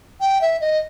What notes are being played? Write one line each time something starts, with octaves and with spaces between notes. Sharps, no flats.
G5
E5
D#5